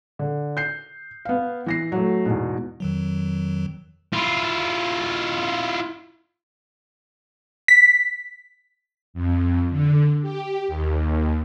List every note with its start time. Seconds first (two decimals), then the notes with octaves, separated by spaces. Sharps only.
0.19 D3
0.57 G6 C7
1.25 B3 F5
1.66 E3 A#6 C7
1.92 F#3 A3
2.26 E2 G#2 B2
2.80 F2 D#3 F#3
4.13 E4 F4
7.68 B6
9.14 F2
9.70 D3
10.22 G4
10.68 D#2